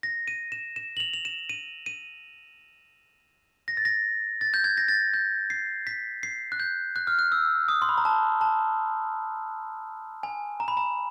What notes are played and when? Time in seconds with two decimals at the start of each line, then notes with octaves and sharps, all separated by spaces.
0.03 A#6
0.28 D#7
0.52 E7
0.76 E7
0.97 F#7
1.00 F7
1.13 F7
1.25 E7
1.49 D#7
1.86 D#7
3.68 A#6
3.77 A6
3.85 A#6
4.41 A6
4.54 G6
4.64 G#6
4.77 A#6
4.88 A6
5.14 G6
5.50 C7
5.87 B6
6.23 C7
6.52 F#6
6.60 G6
6.96 F#6
7.07 F6
7.19 F#6
7.32 E6
7.68 D#6
7.82 C6
7.89 B5
7.98 A#5
8.05 A5
8.41 A5
10.23 G#5
10.60 A#5
10.68 B5
10.77 A#5